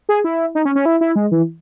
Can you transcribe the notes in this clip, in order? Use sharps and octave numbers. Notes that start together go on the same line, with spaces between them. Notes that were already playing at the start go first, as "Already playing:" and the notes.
G#4
E4
D#4
C#4
C#4
E4
E4
G#3
E3